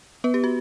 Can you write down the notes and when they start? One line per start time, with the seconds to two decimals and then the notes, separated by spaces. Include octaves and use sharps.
0.24 B3 B4
0.34 G4
0.44 F#4